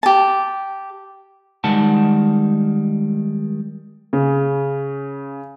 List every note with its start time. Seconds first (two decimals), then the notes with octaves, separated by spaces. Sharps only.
0.03 G4 A5
1.64 D#3 G3 G#3 F#5 A5
4.13 C#3